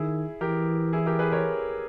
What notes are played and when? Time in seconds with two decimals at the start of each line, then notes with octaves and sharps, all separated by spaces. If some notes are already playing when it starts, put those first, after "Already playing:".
Already playing: D#3 E4 G#4
0.41 E3 G4 A#4
0.93 E4 G#4
1.06 G4 A#4
1.19 G#4 B4
1.32 A#4 C#5